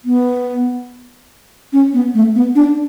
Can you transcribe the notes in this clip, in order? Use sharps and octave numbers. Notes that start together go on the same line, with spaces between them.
B3
C#4
B3
A3
B3
D4